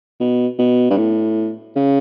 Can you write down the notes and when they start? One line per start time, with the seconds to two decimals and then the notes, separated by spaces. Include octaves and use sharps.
0.20 B2
0.58 B2
0.90 G2
0.97 A2
1.76 C#3